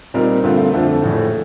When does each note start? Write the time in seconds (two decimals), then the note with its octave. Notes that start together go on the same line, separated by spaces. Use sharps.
0.14 A#2 G3 C4 D#4 A#4
0.43 G2 D3 A3 C4 F4
0.72 F2 D3 F3 A3
1.00 A#1 A2 A3